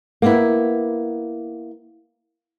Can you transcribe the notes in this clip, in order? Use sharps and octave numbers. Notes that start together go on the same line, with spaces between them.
A#3 B3 E4